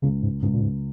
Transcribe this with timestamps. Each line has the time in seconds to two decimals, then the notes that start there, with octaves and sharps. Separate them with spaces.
0.02 C#2 C#3
0.23 G#2
0.42 C#2 G#2
0.53 A#2
0.62 G#2